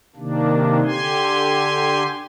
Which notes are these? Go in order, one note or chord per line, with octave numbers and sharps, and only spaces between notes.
C3 D#3 A#3 D4
D3 G4 G#5 C6